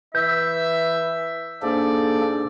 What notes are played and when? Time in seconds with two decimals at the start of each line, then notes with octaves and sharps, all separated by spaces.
0.15 E3 E5 G6
1.62 G#2 A#3 D4 A4 D5